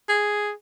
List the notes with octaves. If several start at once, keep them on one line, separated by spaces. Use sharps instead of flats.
G#4